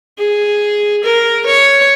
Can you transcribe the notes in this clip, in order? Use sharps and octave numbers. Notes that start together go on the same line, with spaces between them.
G#4
A#4
C#5